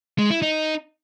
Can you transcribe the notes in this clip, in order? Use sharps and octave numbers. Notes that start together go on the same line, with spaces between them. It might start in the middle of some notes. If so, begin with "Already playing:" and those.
G#3
E4
D#4